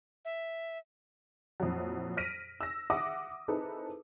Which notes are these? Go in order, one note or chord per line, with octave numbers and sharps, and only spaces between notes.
E5
F2 A#2 E3 F#3
F6 A#6 B6 D7 D#7
E6 A#6
E5 F#5 D6 D#6 A#6
C4 D#4 E4 G#4 A4 B4